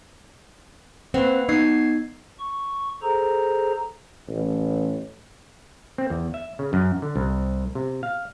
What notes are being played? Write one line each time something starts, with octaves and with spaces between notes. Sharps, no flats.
A#3 C4 B4 F#5
B3 D#4 G#6 C7
C#6
G#4 A4 C5 A#5
A1
C4
E2
E5
C#3
F#2
D3
C2
C3
F5